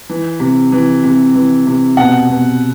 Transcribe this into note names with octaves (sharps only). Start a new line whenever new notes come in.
E3
C3
E3
C3
E3
C3
B2 F#5
B2